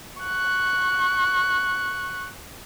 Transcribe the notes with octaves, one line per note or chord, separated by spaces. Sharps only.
C#6 F#6